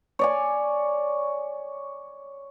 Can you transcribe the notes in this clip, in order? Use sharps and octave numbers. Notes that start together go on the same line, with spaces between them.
C#5 D5 G#5